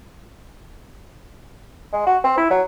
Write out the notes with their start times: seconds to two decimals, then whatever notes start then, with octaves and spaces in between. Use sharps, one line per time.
1.92 G#3
2.06 F#4
2.24 C4
2.37 E4
2.50 F#3